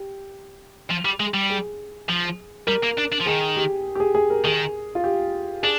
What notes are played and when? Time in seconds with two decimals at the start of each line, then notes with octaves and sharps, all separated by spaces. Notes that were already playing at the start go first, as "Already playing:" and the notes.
Already playing: G4
0.90 F3
1.05 G3
1.20 G#3
1.34 G3
1.50 G#4
2.09 F3
2.67 G3 A#4
2.83 A#3
2.98 D4
3.12 D4
3.20 F3
3.26 D#3 G#4
3.56 G4
3.95 G4
4.00 G#4
4.15 G#4
4.30 A#4
4.44 D#3 G#4
4.95 F4
5.04 G4
5.63 D4 G#4